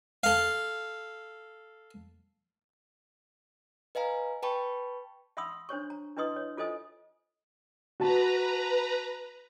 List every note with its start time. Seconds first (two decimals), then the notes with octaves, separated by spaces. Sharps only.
0.23 A4 F5
3.95 B4 D#5 F5 G#5 A#5
4.43 B4 G5 A5 B5 C#6
5.37 E5 F#5 B5 C6 D#6 E6
5.69 D4 C5 C#5 C#6
5.90 A#5
6.17 D4 E4 B4 D#5 C6 D#6
6.36 C#5
6.57 F4 A4 C5 D#5 G#5 D#6
8.00 F#4 B4 A5 A#5